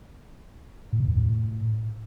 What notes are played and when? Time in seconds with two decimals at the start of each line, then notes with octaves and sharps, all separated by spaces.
0.93 A2
1.00 B2
1.08 E2
1.15 A2